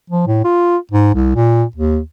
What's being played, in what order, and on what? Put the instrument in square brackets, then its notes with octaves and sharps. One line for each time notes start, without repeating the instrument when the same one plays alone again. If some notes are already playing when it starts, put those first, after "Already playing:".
[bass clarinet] F3
A2
F4
G#2
C2
A#2
D#2